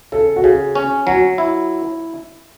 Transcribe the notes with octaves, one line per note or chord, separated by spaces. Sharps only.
C#3 A4
F#4
C#3 G#4
C#4
F#3 F#4
E4